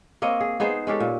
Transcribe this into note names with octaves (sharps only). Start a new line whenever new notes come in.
A#3 C4 C#5 D#5
G#4
B3 D#4 G#4 C5
G#3 C#4 G4 A4
A#2